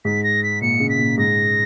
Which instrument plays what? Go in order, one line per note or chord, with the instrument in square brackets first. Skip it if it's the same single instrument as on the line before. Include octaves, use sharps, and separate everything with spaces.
[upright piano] G#2 [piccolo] B6
[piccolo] A#6
B6
[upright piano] A#2 [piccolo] C#7
[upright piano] C#3
[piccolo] B6
[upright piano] A#2
[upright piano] G#2 [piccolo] A#6